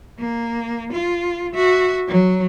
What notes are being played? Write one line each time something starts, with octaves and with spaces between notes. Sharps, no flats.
A#3
F4
F#4 E5
F#3